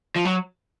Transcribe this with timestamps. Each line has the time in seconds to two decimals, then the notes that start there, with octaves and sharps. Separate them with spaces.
0.16 F3
0.25 F#3